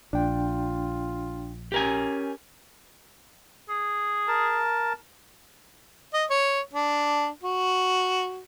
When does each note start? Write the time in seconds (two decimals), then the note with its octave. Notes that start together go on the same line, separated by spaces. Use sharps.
0.13 A#1 D4 F4 G5
1.72 C#4 G4 A#4 G#5
3.69 G#4
4.28 A#4 A5
6.13 D#5
6.30 C#5
6.73 D4
7.43 F#4